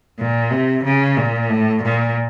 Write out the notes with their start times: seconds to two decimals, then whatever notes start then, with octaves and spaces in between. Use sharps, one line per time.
0.19 A#2
0.51 C3
0.85 C#3
1.17 A#2
1.50 A2
1.83 A#2